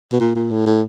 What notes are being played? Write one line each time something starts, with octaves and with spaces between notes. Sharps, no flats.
B2
A#2
A#2
A2
A2